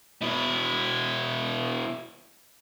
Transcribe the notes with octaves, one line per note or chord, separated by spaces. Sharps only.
B2 E4